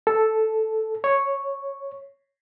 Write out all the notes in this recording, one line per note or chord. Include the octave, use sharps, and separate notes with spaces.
A4
C#5